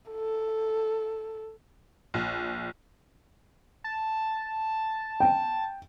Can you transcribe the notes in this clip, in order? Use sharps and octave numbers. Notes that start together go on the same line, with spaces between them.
A4
A#1
A5
G5